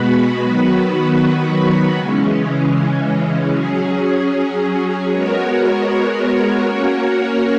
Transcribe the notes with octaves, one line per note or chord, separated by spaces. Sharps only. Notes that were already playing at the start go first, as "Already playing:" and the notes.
Already playing: B2 G#3 B3 F#4 B4
D#3 F#3 B3 F#4 B4
C#3 E3 G#3 C#4
F#3 C#4 G#4
G#3 B3 F#4 A#4 C#5
A#3 C#4 F#4 A#4 C#5